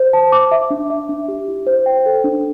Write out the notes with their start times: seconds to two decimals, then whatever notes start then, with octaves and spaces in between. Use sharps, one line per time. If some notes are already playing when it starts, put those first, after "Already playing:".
Already playing: C5
0.13 A5
0.32 D6
0.51 E5
0.70 D4
0.90 E5
1.09 D4
1.28 G4
1.48 E4
1.67 C5
1.86 G5
2.06 A4
2.24 D4